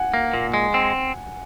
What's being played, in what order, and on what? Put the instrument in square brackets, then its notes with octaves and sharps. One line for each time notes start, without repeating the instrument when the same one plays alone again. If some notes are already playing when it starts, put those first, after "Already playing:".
Already playing: [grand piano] F#5 G#5
[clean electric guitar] A#3
A#2
G#3
C4